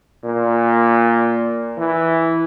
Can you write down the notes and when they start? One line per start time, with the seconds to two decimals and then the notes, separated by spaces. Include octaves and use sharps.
0.24 A#2
1.77 E3